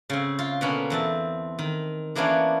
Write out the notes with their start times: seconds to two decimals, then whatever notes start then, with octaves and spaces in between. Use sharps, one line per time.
0.10 C#3 C4
0.39 F4
0.61 B2 D3 A#3 B3 C#4
0.90 E2 C4 A5
1.59 D#3
2.15 E3 A#3 B3 C#4 D4